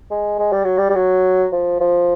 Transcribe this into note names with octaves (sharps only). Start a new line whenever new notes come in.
G#3
G#3
G3
F#3
G3
G3
F#3
F3
F3